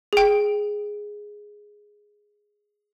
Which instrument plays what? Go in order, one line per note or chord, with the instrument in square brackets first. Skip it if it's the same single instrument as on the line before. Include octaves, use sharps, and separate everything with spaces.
[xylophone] G#4 G5